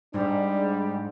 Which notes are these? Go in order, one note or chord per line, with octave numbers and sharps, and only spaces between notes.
G#2 G3 D4